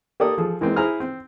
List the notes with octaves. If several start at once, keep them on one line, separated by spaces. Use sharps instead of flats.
A#3 G4 A4 D5 D#6
F3 G#4 A4
E3 G#3 A#3 C4
E4 G#4 C5 G#5 A#5 F6
C4